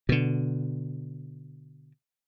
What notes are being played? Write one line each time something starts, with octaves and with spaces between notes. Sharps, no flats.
B2 D3